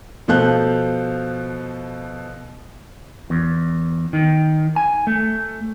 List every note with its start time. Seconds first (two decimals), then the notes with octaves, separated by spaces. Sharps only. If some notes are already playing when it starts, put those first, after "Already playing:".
0.28 B2 F3 A4 F5 F#6 G6
3.30 E2
4.13 D#3
4.76 G#5
5.07 A3